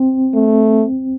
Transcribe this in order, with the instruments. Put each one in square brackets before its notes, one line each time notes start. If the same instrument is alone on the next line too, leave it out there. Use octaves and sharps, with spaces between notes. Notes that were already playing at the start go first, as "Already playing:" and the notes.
Already playing: [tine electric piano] C4
[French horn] A3